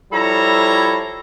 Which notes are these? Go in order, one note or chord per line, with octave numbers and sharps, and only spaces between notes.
F3 G3 E4 A4 C#5 A#5